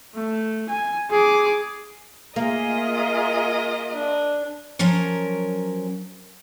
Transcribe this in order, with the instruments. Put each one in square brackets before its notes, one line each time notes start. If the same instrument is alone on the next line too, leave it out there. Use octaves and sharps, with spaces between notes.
[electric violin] A3
G#5
G#4 D6
[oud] A#3 [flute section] F4 G#4 E5 [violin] A#4 D#5
[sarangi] D4
[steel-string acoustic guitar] F3 F#3 C#4 A#4